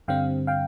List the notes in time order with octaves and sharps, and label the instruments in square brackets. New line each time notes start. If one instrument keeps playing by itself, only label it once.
[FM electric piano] G2 D3 G3 C4 F5 G5
F5 G5